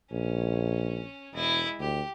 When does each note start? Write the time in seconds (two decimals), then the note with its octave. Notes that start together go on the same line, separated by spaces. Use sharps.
0.12 A#1 C#4
1.34 E1 G#3 E4
1.80 D2 G4